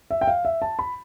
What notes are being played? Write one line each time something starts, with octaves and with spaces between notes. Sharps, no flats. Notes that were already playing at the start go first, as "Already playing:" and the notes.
E5
G5
F5
E5
A5
B5